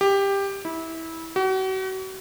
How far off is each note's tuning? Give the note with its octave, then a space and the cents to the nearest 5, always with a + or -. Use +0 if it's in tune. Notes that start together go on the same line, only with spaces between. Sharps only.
G4 +15
E4 -20
F#4 +40